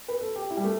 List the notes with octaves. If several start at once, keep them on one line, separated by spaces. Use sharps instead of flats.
B4
A4
G4
E4
G3
A3